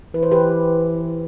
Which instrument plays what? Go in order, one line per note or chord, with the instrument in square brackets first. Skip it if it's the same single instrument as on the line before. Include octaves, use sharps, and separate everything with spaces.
[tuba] E3 [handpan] B4
[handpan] C5
G4 B4